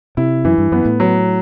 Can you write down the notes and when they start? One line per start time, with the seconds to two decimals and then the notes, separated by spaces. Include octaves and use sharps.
0.17 C3 E4
0.45 F#2 E3
0.58 G2
0.72 F#2 B3
0.85 A2
1.00 F#3